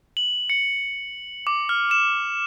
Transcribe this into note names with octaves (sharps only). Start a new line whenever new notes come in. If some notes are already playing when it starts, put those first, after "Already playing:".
F#7
C#7
D6
F6
E7